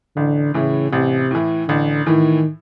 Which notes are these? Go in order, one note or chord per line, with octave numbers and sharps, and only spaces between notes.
A1 D3
A2 C#3 E3
A1 C3
A2 E3
A1 D3
A2 D#3 E3